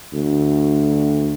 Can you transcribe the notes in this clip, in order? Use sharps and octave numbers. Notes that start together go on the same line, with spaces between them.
D2